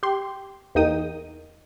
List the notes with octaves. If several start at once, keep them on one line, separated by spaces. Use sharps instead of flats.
G4 C6
E2 A#3 D#4 G5 D#6